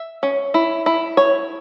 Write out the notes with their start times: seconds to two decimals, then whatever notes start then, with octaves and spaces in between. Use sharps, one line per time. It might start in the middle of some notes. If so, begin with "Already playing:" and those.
Already playing: E5
0.23 C#4
0.54 E4
0.86 E4
1.17 C#5